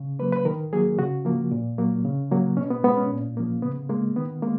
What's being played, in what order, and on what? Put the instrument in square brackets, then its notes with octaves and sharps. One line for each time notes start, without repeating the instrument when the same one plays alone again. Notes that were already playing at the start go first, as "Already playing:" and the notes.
Already playing: [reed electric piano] C#3
F#3 A#3 B4
B4
D#3 A#4
F#3 A#3 G#4
C#3 F#4
F3 A#3
A#2
F#3 A#3
C#3
F#3 A#3
B2 C#4
B3
G#3 B3
C#4
A#2
F3 A#3
C#3 B3
G#3 A#3
D#3 B3
G#3 A#3